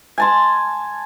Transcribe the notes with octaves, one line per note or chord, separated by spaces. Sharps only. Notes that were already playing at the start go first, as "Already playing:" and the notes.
G#5 A5 C6